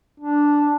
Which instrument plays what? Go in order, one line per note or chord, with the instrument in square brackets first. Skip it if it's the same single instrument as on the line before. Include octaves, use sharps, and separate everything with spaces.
[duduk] D4